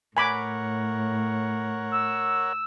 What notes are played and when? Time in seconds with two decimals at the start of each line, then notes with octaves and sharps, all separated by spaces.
0.17 A2 A#4 C#5 F#5 G#5 B5 D6
1.92 E6